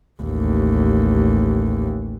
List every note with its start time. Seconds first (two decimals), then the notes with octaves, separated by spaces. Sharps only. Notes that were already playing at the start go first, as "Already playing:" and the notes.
0.21 A1 D#2